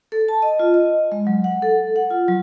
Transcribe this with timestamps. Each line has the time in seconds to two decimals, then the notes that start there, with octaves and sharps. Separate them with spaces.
0.12 A4
0.28 A5
0.42 D#5
0.59 F4
0.74 D#5
1.12 G#3
1.27 F#3
1.44 F#5
1.62 A4
1.96 F#5
2.11 F4
2.28 F#3